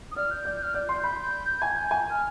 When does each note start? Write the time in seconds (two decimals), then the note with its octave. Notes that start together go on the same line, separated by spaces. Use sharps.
0.12 D#6
0.16 D5 F6
0.31 G6
0.45 D5
0.63 F6
0.74 D5 G6
0.89 C6 G6
1.03 B5 G6
1.62 G#5 G#6
1.76 G6
1.91 G#5
2.10 F6